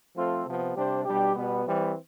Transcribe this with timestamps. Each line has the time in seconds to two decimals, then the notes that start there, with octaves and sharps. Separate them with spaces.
0.15 F3 A3 C4 F4 A4
0.45 C3 F3 B3
0.75 C3 G3 D4 G4 C5
1.05 B2 G3 D4 G4
1.36 B2 G3 B3
1.66 E3 G3 C4